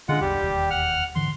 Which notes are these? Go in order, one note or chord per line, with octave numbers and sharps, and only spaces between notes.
D3 G#3 D4 F4 F#5
A#1 E2 G3 G4
E1 D#2
F#5 F6
G#2 D3 E3 C6